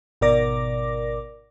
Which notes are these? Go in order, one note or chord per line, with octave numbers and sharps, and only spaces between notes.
G#1 B2 A#4 D5 D6 A#6